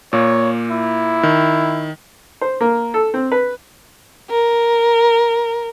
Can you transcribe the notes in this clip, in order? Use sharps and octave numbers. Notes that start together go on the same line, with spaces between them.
A#2 A#3 C#5
E4
D#3
C5
A#3
A4
C4
B4
A#4